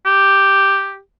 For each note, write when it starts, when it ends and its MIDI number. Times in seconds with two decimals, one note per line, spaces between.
0.06 0.99 67